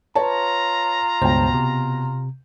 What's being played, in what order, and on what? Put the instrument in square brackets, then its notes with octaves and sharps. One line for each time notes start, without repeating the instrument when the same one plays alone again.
[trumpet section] F4 A#5 [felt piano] B4 C#5 A5
[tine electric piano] C#2 G2 C5 [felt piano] B2 G5
[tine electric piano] C3